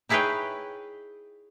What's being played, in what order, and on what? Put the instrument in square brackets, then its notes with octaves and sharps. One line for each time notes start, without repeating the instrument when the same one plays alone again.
[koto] D#4 E4 G#4 B4 C#5 G5